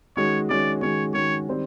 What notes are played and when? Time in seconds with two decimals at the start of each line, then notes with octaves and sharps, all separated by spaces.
0.17 D#3 G#3 C#4 F#4 C#5
0.49 D#3 G#3 C#4 F#4 D5
0.81 D#3 G#3 C#4 F#4 C#5
1.14 D#3 G#3 C#4 F#4 C#5
1.48 D#3 G3 C4